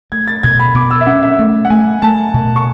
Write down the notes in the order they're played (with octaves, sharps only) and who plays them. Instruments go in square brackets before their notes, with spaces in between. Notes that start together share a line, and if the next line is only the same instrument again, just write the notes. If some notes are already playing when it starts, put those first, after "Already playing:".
[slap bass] A3 [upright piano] G#6
[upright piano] A6
[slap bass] B2 [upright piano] G#6
[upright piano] B5
[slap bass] B2 [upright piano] D6
[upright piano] E6
E5
[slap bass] C#4 [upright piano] F#5
[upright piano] E5
[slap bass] A3
[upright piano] F#5
[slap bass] A3 [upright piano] G#5
[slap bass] A3 [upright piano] A5
[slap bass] B2
[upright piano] C#6